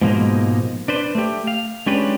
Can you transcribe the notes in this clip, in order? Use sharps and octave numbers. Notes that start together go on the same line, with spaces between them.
G#2 B2 F3 G#3 A#3 D#4
D4 B4 C5
A3 G4
F5
G#3 C#4 D4 F4 G4 B4